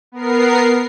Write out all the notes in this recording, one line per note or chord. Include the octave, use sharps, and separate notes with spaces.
B3 A#4 C7